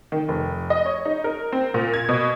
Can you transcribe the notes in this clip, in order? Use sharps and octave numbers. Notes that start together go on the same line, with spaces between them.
D#3
F1
D#5
C#5
D#4
A#4
C4
A#2
G#6
B2